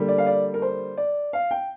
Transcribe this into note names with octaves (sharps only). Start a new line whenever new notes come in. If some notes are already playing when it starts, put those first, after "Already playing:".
Already playing: D3 G3 A#3
D5
F5
D5
A#4
C5
D5
F5
G5